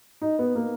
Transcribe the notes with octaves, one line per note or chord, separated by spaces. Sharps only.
D#4
B3
A#3